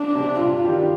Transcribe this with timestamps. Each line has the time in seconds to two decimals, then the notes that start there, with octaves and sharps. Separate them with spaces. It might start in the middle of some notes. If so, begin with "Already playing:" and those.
Already playing: D4
0.15 C3 G3 C4
0.40 G2 F4
0.65 D#3 G3 D4 G4